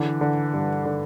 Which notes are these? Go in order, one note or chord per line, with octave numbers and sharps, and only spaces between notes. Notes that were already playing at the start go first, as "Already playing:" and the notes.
Already playing: D3 E3
D3
G2
D3